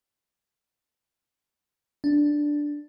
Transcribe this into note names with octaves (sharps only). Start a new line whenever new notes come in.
D4